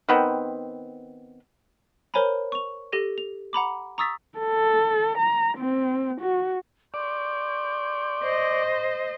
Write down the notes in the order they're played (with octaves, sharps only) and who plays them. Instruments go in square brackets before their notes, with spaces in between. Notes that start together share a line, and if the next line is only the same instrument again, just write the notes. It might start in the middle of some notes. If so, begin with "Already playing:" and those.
[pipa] D#3 B3 C4
[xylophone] A#4 C5 C#5 G#5 A#5 B5
C#6 F7
G4 A4 A#6 D#7
F7
F#5 A#5 B5 D6
A#5 C#6 D#6 E6 A6 B6
[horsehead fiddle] A4
A#5
C4
F#4
[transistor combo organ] D5 [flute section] C6 C#6 G6
[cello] C5 D#5